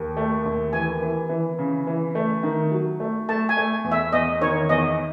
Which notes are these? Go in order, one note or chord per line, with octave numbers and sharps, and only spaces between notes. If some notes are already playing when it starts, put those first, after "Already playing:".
Already playing: D#2
A3
D#2
E3 G#5
E3
E3
C#3
E3
A3
D#3
F#3
A3
A3 A5
G#5
A3
E2
E5
E2 D#5
D#3 C#5
E2 D#5